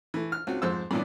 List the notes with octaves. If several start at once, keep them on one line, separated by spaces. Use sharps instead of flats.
E3 A3
F6
C#2 C4 F#4
F2 G#2 C5 E6
G2 A#2 E3 B3 C#4 D4